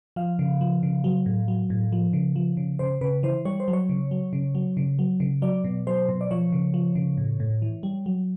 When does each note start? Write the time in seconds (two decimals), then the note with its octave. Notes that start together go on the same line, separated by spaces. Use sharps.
0.16 F3 F5
0.39 C#3
0.61 F3
0.83 C#3
1.04 F#3
1.26 A2
1.48 F#3
1.70 A2
1.92 F3
2.13 C#3
2.36 F3
2.57 C#3
2.79 C#3 C5
3.01 C#3 B4
3.23 E3 C5
3.45 G3 C#5
3.60 C5
3.68 F#3
3.73 C#5
3.89 C#3
4.11 F#3
4.33 C#3
4.55 F#3
4.77 C#3
4.99 F#3
5.20 C#3
5.42 F#3 D5
5.64 B2
5.87 F#3 C5
6.09 B2
6.21 D5
6.31 F3 C#5
6.52 C#3
6.74 F3
6.95 C#3
7.17 A2
7.40 A2
7.62 E3
7.83 G3
8.06 F#3